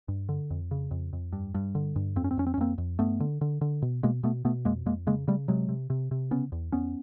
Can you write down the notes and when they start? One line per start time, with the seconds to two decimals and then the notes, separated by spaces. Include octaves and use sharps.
0.08 G2
0.29 D3
0.51 F2
0.71 C#3
0.91 F2
1.13 F2
1.33 G2
1.55 G2
1.75 D3
1.96 G2
2.16 F2 C4
2.24 C#4
2.31 C4
2.37 F2 C#4
2.47 C4
2.54 C#4
2.57 F2 A#3 C4
2.78 F2
2.99 G2 A3 B3
3.20 D3
3.41 D3
3.61 D3
3.82 B2
4.03 B2 G#3 A#3
4.23 B2 A3 B3
4.45 B2 A3 B3
4.65 F2 G#3 A#3
4.86 F2 G#3 A#3
5.07 C#3 G#3 A#3
5.28 C#3 G3 A3
5.48 C3 F#3 G#3
5.69 C3
5.90 C3
6.11 C3
6.31 C#3 B3 C#4
6.52 E2
6.72 E2 B3 C#4